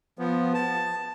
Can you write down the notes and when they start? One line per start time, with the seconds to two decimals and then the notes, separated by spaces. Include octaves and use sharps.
0.19 F3 B3
0.54 A5